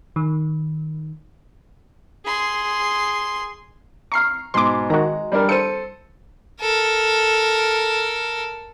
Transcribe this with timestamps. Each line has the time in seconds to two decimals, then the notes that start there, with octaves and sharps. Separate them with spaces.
0.16 D#3
2.25 G#4 C6
4.12 A#5 C#6 F6 C7
4.54 G#2 B2 C6 D6
4.90 D#3 G#3 F#4 A#5
5.32 G3 D4 A#4
5.49 A4 C5 C#7 D#7
6.61 A4 A#4